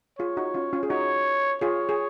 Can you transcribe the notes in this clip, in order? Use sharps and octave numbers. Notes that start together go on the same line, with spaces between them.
F4 G#4 C#5
D#4 F#4
C#4 F4
C#4 F4
G#4
D#4 F#4 C#5
F4 G#4 C#5
G#4